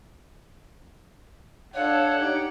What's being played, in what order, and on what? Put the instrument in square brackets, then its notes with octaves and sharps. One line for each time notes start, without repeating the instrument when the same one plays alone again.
[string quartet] D4 A4 [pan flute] C#5 [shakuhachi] F5 [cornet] F#5
[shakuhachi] D#4 [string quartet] G4